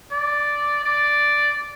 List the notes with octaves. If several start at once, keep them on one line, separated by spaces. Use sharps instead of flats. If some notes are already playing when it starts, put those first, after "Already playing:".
D5
D5